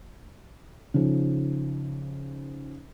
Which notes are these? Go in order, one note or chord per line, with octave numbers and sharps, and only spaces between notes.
C#3 F3 D#4